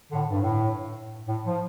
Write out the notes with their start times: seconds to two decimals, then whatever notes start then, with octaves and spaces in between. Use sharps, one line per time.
0.12 A2 D3
0.31 G2
0.42 A2
1.27 A2
1.46 F3